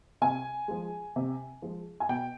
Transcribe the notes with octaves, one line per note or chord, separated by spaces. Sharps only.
C3 G#5
F3 G#3
C3
F3 G#3
G#5
B2 G5